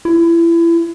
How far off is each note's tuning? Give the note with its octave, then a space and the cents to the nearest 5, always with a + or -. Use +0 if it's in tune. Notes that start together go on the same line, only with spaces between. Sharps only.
E4 +30